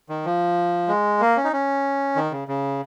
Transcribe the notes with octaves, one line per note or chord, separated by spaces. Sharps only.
D#3
F3
G#3
A#3
C#4
D#4
C#4
D#3
C#3
C#3